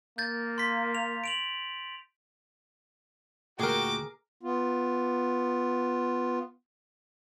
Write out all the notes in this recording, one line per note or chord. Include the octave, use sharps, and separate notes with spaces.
A#3 G6 A6
C6 B6
F7
D7 F7 F#7
D2 A#2 F#4 G#4 A#4 G5 D6
B3 F4